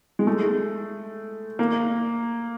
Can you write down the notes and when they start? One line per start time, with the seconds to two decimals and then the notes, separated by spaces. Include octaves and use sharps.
0.19 G#3
0.27 A3
1.59 A#3